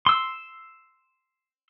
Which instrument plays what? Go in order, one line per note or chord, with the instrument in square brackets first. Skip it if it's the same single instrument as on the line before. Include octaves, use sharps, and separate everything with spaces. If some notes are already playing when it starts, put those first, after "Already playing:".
[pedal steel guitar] C6 E6